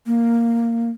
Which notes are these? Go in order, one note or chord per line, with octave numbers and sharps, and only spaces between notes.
A#3